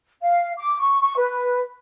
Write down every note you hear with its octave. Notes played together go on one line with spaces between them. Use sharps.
F5
D6
C#6
C#6
B4